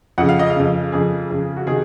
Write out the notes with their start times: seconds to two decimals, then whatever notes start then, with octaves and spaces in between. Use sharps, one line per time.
0.18 F2 C#3 F#5
0.29 F5
0.39 D#5
0.50 F5
0.56 F2 C#3
0.92 F2 C#3 G#4
1.30 F2 C#3
1.56 F#4
1.67 C3 D#3 G#4